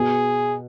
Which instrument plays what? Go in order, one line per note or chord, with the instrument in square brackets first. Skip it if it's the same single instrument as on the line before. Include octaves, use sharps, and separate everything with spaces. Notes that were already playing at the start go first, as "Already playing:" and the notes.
Already playing: [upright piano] B2 [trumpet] G#4